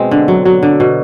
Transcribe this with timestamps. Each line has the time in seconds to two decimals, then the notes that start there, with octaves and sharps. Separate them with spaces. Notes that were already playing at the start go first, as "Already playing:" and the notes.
Already playing: B2 G#3 C4
0.11 D3
0.28 F#3
0.45 F#3
0.63 D3
0.80 B2